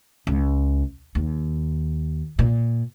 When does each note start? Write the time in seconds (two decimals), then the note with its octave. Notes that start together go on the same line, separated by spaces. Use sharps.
0.27 C#2
1.15 D#2
2.39 A#2